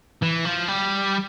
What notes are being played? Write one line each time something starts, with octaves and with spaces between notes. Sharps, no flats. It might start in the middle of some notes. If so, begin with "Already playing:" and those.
E3
F3
G3